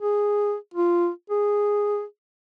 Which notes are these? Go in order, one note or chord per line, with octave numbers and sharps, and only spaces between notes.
G#4
F4
G#4